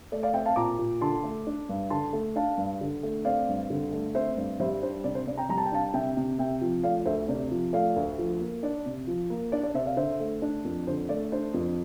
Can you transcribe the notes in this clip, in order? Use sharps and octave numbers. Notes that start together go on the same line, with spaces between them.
A3 D5
D5 F5
C4 E5 G5
F5 A5
A#2 A#5 D6
A#2
D3 A5 C6
A3
D4
G2
D3 A5 C6
A3
D4 F5 A5
G2
D3
A3
C4 D5 F5
G2
D3
A3
C4 C5 E5
G2
G3 C5 E5
D4 C5
C3 D5
C5
C3 D5
G5 A#5
G3 A#5
A5
G5
D4 F5 A5
C3 E5 G5
C3
C3 E5 G5
F3
A3 D5 F5
D2 C5 E5
C3 D5
F3
A3 D5 F5
D2
F3
A#3
D4 D5
C3
F3
A#3
D4 D5
D5
C3 C5 E5
D5 F5
D3 C5 E5
A3
D4
F2
D3 C5
A3 D5
D4 C5
F2